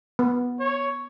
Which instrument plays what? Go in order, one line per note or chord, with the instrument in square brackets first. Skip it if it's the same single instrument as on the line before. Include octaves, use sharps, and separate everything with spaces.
[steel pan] B3
[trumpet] C#5